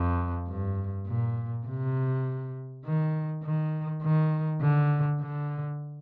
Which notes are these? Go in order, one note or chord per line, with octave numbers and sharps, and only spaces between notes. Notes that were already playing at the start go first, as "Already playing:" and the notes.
Already playing: F2
G2
A#2
C3
D#3
D#3
D#3
D3
D3